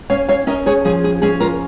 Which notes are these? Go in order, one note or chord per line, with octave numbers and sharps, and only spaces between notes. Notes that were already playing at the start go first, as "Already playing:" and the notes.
C#4 C#5 F5
C#5 F5
C#4 A#4 D#5
G#4 C#5
F3 G#4
G#4
C#4 G#4
F4 A#4